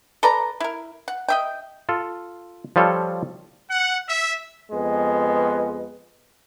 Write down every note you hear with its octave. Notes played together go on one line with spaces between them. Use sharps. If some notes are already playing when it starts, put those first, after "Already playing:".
A4 B4 D5 A#5
E4 A#4
F#5
D#5 E5 G5
F4 A4
F3 G3 F4 A4 C#5
F#5
E5
F2 G#3 B3